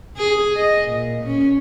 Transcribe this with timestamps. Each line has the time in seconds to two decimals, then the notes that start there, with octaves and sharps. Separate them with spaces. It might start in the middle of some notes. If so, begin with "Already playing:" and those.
0.17 G#4
0.57 D#5
0.88 A#2
1.24 C#4